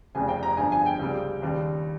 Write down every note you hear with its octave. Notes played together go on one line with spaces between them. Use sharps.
F1 F2 C#3 G3 G#5
G5
A#5
G1 G2 F3 G#5
G#5
G5
C#2 C3 G3
D#2 C#3 G3